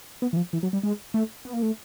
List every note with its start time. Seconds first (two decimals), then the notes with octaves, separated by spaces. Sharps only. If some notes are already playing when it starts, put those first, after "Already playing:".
0.22 B3
0.33 E3
0.37 F3
0.53 E3
0.63 F#3
0.73 G3
0.83 G#3
1.14 A3
1.45 B3
1.53 A#3
1.63 A3